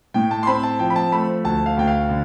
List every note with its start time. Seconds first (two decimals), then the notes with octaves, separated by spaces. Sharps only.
0.14 A2 G5
0.31 A5
0.43 C6
0.47 C4 B5
0.63 A5
0.79 F3 G5
0.90 B5
0.96 A5
1.12 A3 B5
1.44 D2 A5
1.66 F5
1.77 D2 G5
1.87 F5
2.09 D3